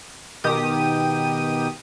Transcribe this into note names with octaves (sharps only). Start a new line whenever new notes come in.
B2 D#3 G4 D#6